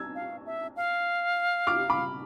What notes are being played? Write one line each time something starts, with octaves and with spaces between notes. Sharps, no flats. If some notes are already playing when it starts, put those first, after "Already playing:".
Already playing: E6 G#6
F5
E5
F5
D6 F6
B5 D6